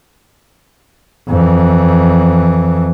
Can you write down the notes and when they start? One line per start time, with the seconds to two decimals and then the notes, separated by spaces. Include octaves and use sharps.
1.28 F2 E3